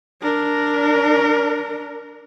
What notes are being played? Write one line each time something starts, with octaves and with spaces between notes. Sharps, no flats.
D4 A#4